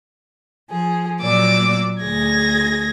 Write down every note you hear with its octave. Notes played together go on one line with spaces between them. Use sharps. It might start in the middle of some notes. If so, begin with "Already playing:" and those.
F3 G#4
A#2 F#3 A#3 D5 D6 E6
D2 G#4 G#6 A#6